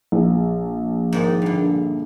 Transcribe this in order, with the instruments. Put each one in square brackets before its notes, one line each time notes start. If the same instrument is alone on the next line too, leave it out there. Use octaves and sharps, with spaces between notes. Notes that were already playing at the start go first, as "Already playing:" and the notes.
[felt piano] A#1
[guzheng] G#2 D#3 D5
G2 D3